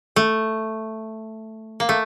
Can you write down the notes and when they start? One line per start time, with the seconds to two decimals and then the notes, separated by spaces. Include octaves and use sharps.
0.16 A3
1.80 A#3
1.89 A3